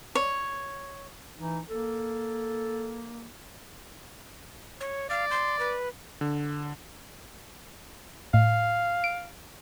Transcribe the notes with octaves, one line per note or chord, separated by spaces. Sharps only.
C#5
E3 D#4
A#3 A4
C#5
D5 F5
C6
B4
D3
A2 F5
D7